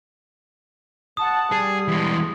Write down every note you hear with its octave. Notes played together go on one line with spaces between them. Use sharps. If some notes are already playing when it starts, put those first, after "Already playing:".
F#5 A5 D#6
G3 G#4
E3 G#3